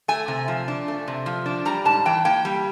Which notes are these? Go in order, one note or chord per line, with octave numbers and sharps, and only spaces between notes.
A3 G#5
C3
F3
D4
A3
C3
F3
D4
G3 A#5
G#2 A5
E3 G5
A#3 G5
G3